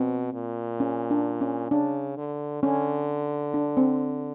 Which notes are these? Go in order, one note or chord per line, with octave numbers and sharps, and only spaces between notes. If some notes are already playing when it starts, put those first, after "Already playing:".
Already playing: B2 C4
A#2
C#4
D4
C#4
C#3 D4
D3
D3 C#4
D4
C4